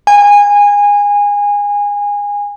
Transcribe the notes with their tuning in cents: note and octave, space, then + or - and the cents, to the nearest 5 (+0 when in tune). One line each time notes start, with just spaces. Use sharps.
G#5 -20